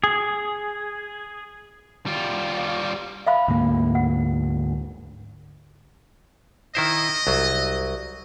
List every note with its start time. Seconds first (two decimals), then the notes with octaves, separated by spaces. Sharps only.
0.04 G#4
2.06 G3 F4
3.26 E5 F5 B5
3.48 D2 G#2 A#3
3.95 F#5
6.75 D#3 E4 C5 D#5
7.27 C2 F#3